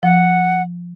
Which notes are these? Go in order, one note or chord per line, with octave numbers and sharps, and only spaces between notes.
F3 F#5